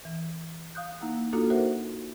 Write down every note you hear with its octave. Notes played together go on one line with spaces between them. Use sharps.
E3
F5 D#6 F#6 G6
A#3 D#4 E4 F#5
A#3 D4 D#4 F4 F#4 A4
F#4 A#4 C5 E5 F#5